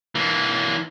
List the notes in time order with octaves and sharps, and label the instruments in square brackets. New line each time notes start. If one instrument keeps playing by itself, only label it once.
[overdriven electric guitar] E3 A#3